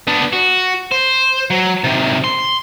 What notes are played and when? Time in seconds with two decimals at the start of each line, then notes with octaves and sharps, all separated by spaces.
0.07 B3 D4
0.33 F#4
0.92 C5
1.50 F#3
1.84 C3 D#3
2.24 C6